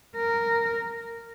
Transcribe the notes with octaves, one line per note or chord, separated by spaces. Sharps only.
A#4